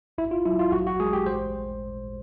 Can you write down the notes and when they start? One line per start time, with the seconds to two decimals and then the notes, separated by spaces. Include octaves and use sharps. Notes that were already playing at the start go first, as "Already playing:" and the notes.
0.18 G#1 E4
0.31 F4
0.45 F#3 E4
0.59 F4
0.72 A1 F#4
0.87 F#4
1.00 G#3 G#4
1.13 G4
1.26 A1 C5